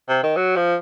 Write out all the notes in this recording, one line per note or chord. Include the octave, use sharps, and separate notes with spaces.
C3
D#3
F#3
F3